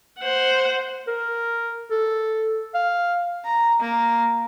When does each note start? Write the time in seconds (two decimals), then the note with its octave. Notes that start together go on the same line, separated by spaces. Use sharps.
0.19 C5 F#5
1.08 A#4
1.91 A4
2.74 F5
3.45 A#5
3.80 A#3